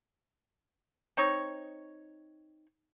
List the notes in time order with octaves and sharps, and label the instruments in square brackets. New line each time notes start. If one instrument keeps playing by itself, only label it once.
[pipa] C4 D#4 C#5